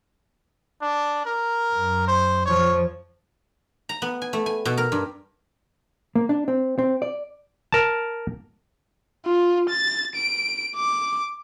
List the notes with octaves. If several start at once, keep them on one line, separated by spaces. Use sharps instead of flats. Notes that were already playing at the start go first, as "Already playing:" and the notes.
D4
A#4
F#2
C5
F2 F3 C#5
A#5
B3
G#5
A3
G#5
B2
A#4
G2
A#3
D4
C4
C4
D5
A#4 A5
F4
A6
D7
D6